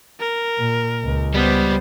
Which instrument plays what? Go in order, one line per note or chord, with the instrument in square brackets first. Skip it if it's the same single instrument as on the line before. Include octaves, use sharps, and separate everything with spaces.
[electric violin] A#4
[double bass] A#2
C#2
[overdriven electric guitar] G3 [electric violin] B3 C5